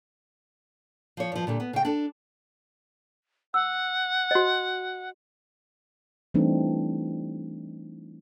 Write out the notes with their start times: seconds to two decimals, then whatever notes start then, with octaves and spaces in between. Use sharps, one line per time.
1.17 F3 C#5
1.32 G2 F3
1.47 A#2 D3 G3
1.60 B3
1.73 C#3 G5
1.85 D4 A4
3.54 F#5 E6
4.31 F#4 D#5
6.34 E3 G3 A3 C4 D4 D#4